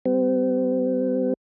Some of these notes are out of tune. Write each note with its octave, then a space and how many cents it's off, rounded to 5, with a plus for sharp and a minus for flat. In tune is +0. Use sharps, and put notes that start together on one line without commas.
G3 -10 C4 -40